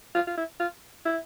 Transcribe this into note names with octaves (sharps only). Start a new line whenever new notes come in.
F4
F4
E4
F4
E4